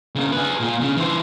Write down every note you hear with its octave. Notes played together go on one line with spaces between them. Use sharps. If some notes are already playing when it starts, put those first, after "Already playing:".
C#3 A#3
G#4 B4
A#2
C#3
E3 C5